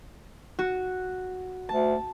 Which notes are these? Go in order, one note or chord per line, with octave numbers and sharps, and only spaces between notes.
F#4
D2 A5